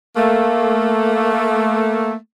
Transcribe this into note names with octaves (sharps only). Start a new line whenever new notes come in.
A3 A#3